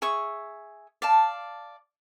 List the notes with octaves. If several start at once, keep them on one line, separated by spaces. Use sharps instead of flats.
G#4 E5 C#6
D5 F5 A5